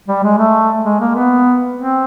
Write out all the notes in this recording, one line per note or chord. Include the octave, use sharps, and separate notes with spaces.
G3
G#3
A3
G#3
A#3
B3
C4